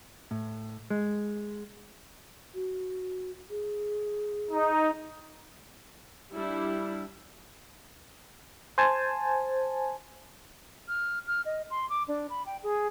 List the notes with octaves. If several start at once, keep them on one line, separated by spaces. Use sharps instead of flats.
A2
G#3
F#4
G#4
D#4
G3 D4 E4
C5 G#5 A5
F6
F6
D#5
C6
D6
D4
B5
G5
G#4